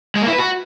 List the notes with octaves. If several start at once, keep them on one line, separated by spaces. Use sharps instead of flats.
G#3
A#3
E4
B4
F#4